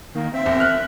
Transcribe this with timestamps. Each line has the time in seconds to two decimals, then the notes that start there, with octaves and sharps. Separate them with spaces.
0.15 D#3 A#3
0.33 C4 E5
0.46 E1
0.60 F6 F#6
0.73 F1